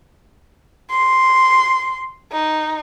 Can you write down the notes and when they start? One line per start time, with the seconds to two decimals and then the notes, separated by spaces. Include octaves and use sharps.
0.90 C6
2.32 D#4